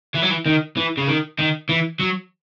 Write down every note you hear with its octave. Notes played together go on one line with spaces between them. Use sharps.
E3
F#3
E3
D#3
E3
C#3
D#3
D#3
E3
F#3